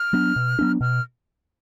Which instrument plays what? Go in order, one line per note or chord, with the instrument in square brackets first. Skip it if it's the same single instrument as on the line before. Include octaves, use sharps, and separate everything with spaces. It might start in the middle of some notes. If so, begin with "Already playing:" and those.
Already playing: [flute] F6
[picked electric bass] F#3 B3 D4
B2
F#3 B3 D4
[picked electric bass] B2 [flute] F6